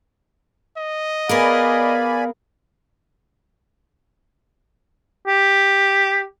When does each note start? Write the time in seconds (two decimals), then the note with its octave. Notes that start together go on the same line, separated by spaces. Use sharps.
0.77 D#5
1.29 B3 G#4 A#4 D5 F5 G#5 B5
5.27 G4